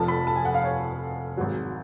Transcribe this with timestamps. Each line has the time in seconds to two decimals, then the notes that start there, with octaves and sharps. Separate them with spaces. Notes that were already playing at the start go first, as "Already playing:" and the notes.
Already playing: F1 F2 F3 A5
0.08 B5
0.27 A5
0.36 G#5
0.45 F#5
0.54 F5
0.64 C#5
1.37 G#1 G#2 F#3